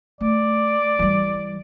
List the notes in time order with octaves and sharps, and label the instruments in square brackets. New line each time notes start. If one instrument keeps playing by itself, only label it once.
[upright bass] A3 [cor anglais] D5
[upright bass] E3 G3